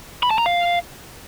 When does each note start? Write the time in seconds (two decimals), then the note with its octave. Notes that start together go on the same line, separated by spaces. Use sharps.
0.23 B5
0.31 A5
0.38 A#5
0.46 F5